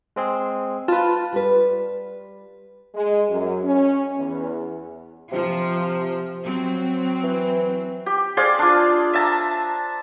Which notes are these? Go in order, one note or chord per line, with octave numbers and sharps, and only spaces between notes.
G#3 C4 G#4
F4 B4 A5
G3 B4
G#3
F#2
C#4
E2
C3 F3
F#3 C4
E3
G4
G#4 C5 D5 F5
D4 F4
E5 A5 A#5